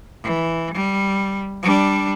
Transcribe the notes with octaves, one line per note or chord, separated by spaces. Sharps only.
E3
G3
G3 D4